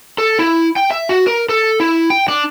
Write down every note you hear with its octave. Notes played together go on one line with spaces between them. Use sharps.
A4
E4
G5
E5
F#4
A#4
A4
E4
G5
D4